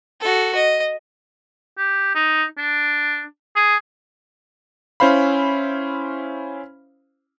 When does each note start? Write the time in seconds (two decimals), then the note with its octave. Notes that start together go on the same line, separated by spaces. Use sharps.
0.20 F#4 A4
0.55 D#5
1.78 G4
2.15 D#4
2.58 D4
3.56 G#4
5.00 C#4 E4 C5 F5 B5